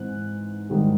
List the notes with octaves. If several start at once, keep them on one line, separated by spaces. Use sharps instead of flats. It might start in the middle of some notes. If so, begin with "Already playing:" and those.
Already playing: G#2 E3 C4 F#6
G#2 D#3 G3